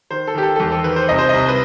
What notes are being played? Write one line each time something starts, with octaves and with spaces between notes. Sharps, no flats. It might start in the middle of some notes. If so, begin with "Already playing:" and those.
D#3 C5
A4
D#3 G4
A4
A4
E2 G4
A4
D#3 B4
C5
C2 D#5
C5
C2 D#5
B4